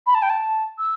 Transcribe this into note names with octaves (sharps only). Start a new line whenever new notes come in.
B5
A5
G5
A5
E6